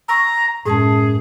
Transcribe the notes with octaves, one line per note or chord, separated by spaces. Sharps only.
A#5 C#6 E6
F#2 A2 G#3 G#4 A5